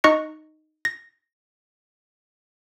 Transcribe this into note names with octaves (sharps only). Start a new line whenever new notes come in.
D#4 D#5 C#6 F#6 A#6 C#7
A#6